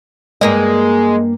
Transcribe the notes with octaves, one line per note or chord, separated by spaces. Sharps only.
G2 G#3 A#3 D#5